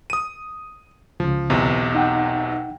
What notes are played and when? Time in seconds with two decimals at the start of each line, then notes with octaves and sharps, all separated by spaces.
0.10 D#6 D#7
1.20 C#2 C#3 F3
1.50 B1 E2 C3
1.95 D#4 F#5 G5